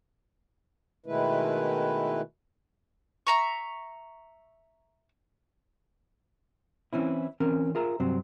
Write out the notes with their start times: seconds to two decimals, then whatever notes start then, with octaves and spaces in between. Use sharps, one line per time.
1.06 B2 D#3 G#3 A3 E4 B4
3.27 E5 A#5 C#6
6.93 E3 C4 C#4 E4
7.40 E3 C4 C#4 A#4
7.75 F4 G#4 A#4 E5 A#5
8.00 G2 C3 F#3 C4